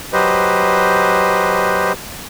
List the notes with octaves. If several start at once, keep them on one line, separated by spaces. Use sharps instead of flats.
F#3 G4 B4 C5 D#5